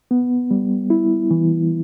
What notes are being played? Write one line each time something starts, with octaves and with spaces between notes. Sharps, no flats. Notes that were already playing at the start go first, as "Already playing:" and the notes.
B3
G3
E4
E3